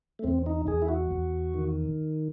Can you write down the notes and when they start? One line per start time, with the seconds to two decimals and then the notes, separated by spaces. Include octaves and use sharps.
0.19 A3
0.24 E2 C4
0.46 D#4
0.67 E2 G#4
0.82 E4
0.88 F#4
1.11 E2
1.54 D#3